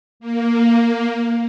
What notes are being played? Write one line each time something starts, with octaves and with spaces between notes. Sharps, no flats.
A#3